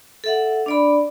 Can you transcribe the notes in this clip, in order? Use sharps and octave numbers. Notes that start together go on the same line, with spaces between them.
A4 E5 F#5
D4 D5 B5